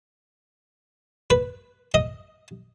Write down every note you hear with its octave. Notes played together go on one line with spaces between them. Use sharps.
B4
D#5